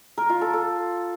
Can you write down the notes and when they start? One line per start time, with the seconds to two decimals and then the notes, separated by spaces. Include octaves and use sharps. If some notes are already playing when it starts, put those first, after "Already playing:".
0.18 A#4
0.29 F4
0.41 A4
0.53 A4